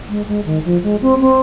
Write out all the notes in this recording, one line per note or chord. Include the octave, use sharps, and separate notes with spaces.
G#3
G#3
D#3
F3
G#3
C4
C4